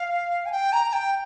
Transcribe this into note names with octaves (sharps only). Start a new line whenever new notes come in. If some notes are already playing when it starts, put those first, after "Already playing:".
Already playing: F5
G#5
G5
A#5
G5